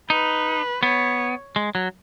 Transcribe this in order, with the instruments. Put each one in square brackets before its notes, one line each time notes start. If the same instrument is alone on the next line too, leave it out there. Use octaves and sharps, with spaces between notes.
[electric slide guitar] D#4 [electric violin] B4
[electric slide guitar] B3 [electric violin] C#5
[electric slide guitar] G#3
F#3